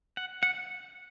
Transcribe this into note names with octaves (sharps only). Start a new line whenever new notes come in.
F#5
F#5